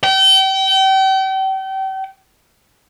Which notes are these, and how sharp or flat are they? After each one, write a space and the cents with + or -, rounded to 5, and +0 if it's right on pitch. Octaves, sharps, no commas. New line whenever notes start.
G5 -35